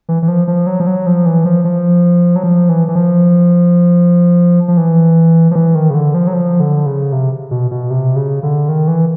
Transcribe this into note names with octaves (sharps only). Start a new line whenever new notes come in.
E3
E3
F3
F3
F#3
F3
F#3
F3
E3
F3
F3
F#3
F3
E3
E3
F3
F3
E3
F3
E3
D#3
C#3
D3
F3
F#3
F3
D3
C#3
C3
B2
B2
C3
C#3
D3
D#3
E3